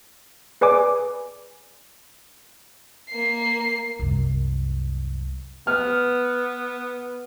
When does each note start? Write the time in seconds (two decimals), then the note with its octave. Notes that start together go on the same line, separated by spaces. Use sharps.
0.61 G#4 B4 D5 G#5 D6
3.10 A#3 C7
3.99 C2 F#2
5.67 B3 F6